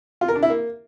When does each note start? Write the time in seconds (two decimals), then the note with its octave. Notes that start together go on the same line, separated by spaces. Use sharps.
0.21 F4
0.28 A#4
0.35 D4
0.43 E4
0.50 A#3